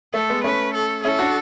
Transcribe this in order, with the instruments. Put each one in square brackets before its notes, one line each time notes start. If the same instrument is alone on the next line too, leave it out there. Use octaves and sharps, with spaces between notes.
[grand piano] A3 [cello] A4
[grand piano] G#3 B3
[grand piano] A3 C#4 [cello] B4
[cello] A4
[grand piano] C#4 E4 [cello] A4
[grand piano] D4 F#4